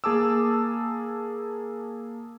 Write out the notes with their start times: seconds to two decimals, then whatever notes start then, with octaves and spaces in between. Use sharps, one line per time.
0.04 A#3 G#4 A5 D6 E6